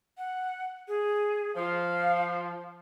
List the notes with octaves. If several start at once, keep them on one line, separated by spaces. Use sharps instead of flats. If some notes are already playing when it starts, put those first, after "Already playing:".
F#5
G#4
F3 F5